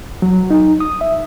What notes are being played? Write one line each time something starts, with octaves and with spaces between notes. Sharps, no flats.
F#3
D#4
D#6
E5